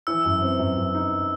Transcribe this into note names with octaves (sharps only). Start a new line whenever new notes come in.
E3 E6
F#2
C4
F#2
F#2
D#4